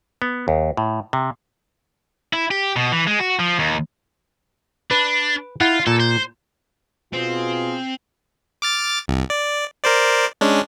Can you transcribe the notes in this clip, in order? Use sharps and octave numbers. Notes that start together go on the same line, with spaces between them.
B3
D#2
A2
C3
E4
G4
B2
E3
G#3
F#4
F3
D#2
D4 B4
E4 F4 F#5
A#2 A4
C5
B2 C4 F4 G#4
D6 F6 A6
C2
D5
A#4 C5 D5
G#3 C#4 D4